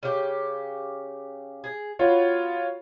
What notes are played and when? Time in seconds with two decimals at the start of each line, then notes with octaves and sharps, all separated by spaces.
0.03 C#3 G4
1.64 G#4
1.99 B3 F4 F#4 C#5